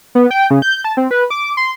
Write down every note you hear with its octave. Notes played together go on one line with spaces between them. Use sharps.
B3
G5
C#3
G6
A5
C4
B4
D6
C6